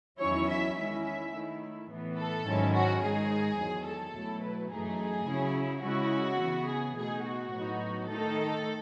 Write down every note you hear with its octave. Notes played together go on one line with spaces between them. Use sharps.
E2 D#3 F#3 C#4 E4 C#5
E5
D#3 G#3 C#4 E4 E5
E5
D#3 A3 E4
A2 E3 B3
A4
G#2 D#3 F#3 C#4 E4
F#4
G#2 D#3 G#3 D#4 G#4
E2 D#3 F#3
A4
B2 F#3 A3 E4
B4
F#2 E3 A3 D#4 G#4
C#3 F#3 C#4 E4
C#3 G#3 C#4 E4 F#4
C#3 E3 B3
G#4
B2 A3 D#4 G#4
F#4
A2 F#3 B3 D#4
D#3 A3 D#4 A4